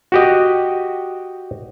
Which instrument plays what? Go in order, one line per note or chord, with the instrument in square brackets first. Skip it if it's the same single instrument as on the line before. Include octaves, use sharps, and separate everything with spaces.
[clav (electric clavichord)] F#4 G4 D#5